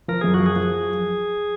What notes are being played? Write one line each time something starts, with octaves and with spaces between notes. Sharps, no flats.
F3 A#4
F#2 G#4
F#4
F3
G#4
F3